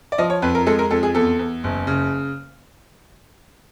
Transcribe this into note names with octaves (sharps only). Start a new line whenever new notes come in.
D5
F3 D#5
C#5
F2 B4
A#4
G#3 A4
A#4
F2 A4
G#4
E2 A4
E2
F#1
C#3